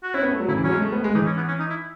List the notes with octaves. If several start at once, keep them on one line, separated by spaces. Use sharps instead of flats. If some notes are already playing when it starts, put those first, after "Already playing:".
F#4
C#4 E4
B3
A3
F#3
C#3 E4
E3
F#3 C#4
G#3
A3
B3
G#3
E3 D#4
C#4
B3
C#4
D#4
E4